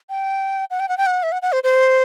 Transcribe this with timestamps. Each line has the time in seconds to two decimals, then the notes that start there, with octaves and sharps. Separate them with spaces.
0.09 G5
0.71 F#5
0.80 G5
0.89 F#5
0.98 G5
1.06 F#5
1.23 E5
1.32 F#5
1.42 F#5
1.52 C5
1.64 C5